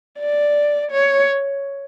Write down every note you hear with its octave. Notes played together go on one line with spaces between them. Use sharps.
D5
C#5